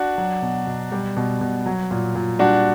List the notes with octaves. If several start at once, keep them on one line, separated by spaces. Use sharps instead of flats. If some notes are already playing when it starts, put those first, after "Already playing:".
Already playing: D4 F#4
F#3
B2
B2
G3
B2
B2
F#3
A#2
A#2
G3 D4 F#4